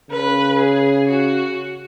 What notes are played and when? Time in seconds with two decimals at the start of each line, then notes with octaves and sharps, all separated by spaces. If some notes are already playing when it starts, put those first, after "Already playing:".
0.11 C#3 B4
0.59 G#4
1.08 F#4